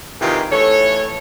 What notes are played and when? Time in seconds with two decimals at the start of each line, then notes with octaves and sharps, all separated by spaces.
0.20 C3 D#3 E3 F4 G4 G#4
0.51 E3 A3 A4 C#5